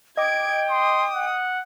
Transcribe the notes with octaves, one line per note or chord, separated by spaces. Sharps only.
D#5 G5 D6 G#6 D7
C6 D#6
F#5